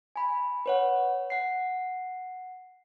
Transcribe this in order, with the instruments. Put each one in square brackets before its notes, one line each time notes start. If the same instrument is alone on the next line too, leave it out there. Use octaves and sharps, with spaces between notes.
[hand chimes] G#5 B5
B4 C#5 F#5
F#5 C7